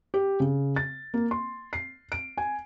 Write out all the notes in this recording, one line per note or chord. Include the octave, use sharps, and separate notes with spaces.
G4
C#3
A6
A#3
C6
C7
D7
G#5